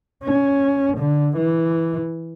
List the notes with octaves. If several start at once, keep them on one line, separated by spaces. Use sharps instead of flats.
C#4
D3
E3